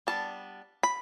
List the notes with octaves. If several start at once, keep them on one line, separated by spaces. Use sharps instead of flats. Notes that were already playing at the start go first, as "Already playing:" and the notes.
G3 B3 D4 A5
B5